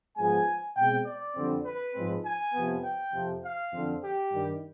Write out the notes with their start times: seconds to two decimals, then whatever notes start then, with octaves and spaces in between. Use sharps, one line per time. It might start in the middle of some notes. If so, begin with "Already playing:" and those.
0.17 G#2 F3 G#3 B3 G#5
0.77 B2 G#3 C4 G5
1.06 D5
1.36 F2 D3 G3 C4
1.66 B4
1.95 G#2 F3 G#3 C4
2.25 G#5
2.54 F2 C3 F3 B3
2.84 G5
3.13 F2 C3 F3
3.43 F5
3.72 F2 D3 F3 C4
4.02 G4
4.33 G2 D#3 G3